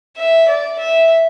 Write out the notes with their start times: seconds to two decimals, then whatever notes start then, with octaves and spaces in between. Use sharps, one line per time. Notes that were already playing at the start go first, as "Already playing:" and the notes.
0.17 E5
0.48 D5
0.78 E5